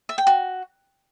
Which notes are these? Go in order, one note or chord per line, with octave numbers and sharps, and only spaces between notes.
E5
G5
F#4